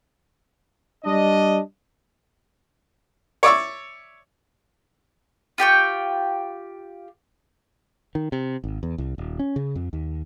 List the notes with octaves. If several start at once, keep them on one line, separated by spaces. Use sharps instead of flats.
G3 D4 D#5
C#5 D5 E5 C#6
F4 G4 G5 C#6
D#3
C3
G#1
E2
C2
D#1
C#4
C#3
F2
D#2